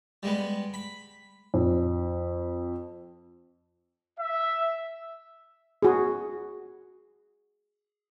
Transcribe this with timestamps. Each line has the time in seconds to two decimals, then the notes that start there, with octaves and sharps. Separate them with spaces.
0.23 G3 G#3 B3
0.74 B5
1.54 F2
4.19 E5
5.83 F#4 G#4